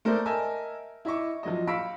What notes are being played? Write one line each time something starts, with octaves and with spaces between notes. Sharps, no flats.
A3 A#4 C5 D5
A#4 D#5 E5 G#5 A5 E6
E4 D#5 E5 C#6 D6
F3 F#3 D#5
F5 B5 C#6 E6 B6 D7